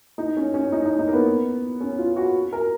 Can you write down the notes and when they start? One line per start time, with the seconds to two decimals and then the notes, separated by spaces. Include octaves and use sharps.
0.18 D#4
0.37 C#4
0.54 C#4
0.72 D#4
0.86 D#4
0.99 D#4
1.08 A#3
1.13 B3
1.81 C#4
1.98 F4
2.16 F#4
2.53 A#4